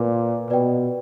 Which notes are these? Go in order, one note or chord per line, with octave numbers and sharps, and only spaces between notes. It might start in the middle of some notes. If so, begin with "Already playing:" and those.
Already playing: A#2 B4 D5 A#5 D6
B2 B4 D5 G5